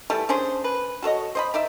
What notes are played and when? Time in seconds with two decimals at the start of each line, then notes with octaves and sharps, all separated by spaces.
0.10 E3 G3 A3 A4
0.29 C#4 D4 G#4 C5
0.64 B4
1.02 F#4 A4 C#5 D#5
1.35 C5 D#5 B5
1.54 D#4 D5 E5